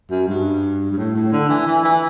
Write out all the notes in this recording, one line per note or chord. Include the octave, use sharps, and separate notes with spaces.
F#2
G2
G2
A2
A2
D3
E3
E3
E3